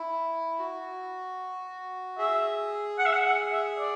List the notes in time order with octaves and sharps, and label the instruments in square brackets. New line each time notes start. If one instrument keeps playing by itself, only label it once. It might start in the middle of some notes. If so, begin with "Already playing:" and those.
Already playing: [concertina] E4
F#4
[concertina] G#4 [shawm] E5
[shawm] F#5
E5
F#5
F#5
E5
D5